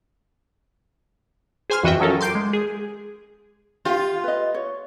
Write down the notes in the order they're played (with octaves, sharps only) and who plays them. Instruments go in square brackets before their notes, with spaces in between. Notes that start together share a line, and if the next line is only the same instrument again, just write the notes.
[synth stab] G#4 C5 G#5 C6 F6
F2 E3 F#4 D#5 E5 G5
F3 F#3 C#4 A4 A#4
C6 D6 G6 C7 D7
G#3
G#4
[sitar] F4 [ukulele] G4 F5
[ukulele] B4 D#5
C#5